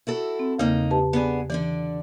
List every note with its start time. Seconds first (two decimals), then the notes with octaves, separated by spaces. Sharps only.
0.07 E4 F#4 A4
0.39 C4
0.59 E2 C#3 A#3 D#4
0.91 G4 B4 A5
1.13 B3 D4 G#4
1.50 D3 E3 D4 D5